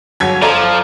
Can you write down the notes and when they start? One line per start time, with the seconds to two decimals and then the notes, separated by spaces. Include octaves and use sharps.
0.20 G1 F#3 G#6
0.42 F3 A4 D5 A#5